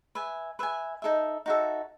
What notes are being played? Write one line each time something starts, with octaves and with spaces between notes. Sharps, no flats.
B4 E5 G#5
B4 E5 G#5
D#4 F#4 A4 E5
D#4 F#4 A4 E5